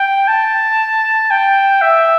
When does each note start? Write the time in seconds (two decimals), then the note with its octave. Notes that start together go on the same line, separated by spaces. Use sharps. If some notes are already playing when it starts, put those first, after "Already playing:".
Already playing: G5
0.28 A5
1.31 G5
1.82 E5